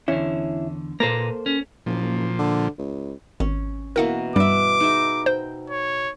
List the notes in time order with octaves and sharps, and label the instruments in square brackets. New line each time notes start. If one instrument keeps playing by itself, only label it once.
[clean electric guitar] E2 D3 [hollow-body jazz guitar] C#4 E4
[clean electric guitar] A#2 B4 A#5 [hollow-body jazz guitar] A#3 A4 C5
[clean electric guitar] C#4
[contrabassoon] F#1 [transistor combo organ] A#2 F3
[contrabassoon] D3
C#2
[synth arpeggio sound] G#1 [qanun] C#4
[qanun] B2 E3 A#3 [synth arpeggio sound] A#4 F#5
[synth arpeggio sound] G2 G3 [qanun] B4 E5 [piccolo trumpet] D6
[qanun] D#4 G#4 E5
[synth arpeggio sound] C5 [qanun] G5
[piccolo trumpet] C#5